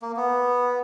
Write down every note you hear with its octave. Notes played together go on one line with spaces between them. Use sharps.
A#3
B3